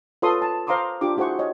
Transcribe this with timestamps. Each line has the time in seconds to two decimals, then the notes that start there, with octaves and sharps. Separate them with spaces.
0.22 F4 A4 B4 C#5 C6 D#6
0.42 A5
0.67 C5 F5 A#5 C6 D6 D#6
1.01 D4 F4 G4 D6
1.17 E4 F#4 G#4 C5 F#5 C#6
1.39 C#5 D#5